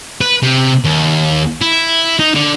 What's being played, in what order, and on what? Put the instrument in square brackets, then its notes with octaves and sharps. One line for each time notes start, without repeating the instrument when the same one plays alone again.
[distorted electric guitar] B4
C3
D#2
E4
D#4
D3